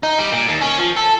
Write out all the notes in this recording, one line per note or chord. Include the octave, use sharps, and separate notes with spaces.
D#4
G3
A#2
D#2
C#4
F3
A4